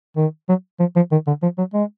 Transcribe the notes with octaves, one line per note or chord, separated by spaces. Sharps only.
D#3
F#3
F3
F3
D#3
D3
F3
F#3
G#3